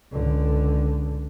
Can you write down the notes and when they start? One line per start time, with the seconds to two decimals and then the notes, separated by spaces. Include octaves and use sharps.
0.12 C#2 D3